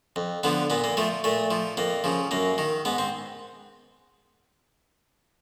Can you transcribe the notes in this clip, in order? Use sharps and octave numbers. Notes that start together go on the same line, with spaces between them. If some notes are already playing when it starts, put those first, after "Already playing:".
F2
D3 F3 B3
A#2 B3
A#3
F3 A3
A#2 A3
F3
F2 A#3
C#3 F3
F#2 A#3
D#3
G#2 B3
C4